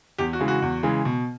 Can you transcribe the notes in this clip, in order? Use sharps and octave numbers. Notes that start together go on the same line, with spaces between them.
E2 G4
F#4
C#3 E3 G#3
F#4
E2
C#3 E3 G#3
B2